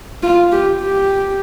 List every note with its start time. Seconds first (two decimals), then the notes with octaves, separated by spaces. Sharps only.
0.23 F4
0.52 G4
0.81 G4